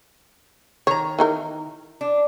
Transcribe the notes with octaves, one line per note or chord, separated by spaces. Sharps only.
D#3 C#5 A#5
E3 D#4 A#4
D4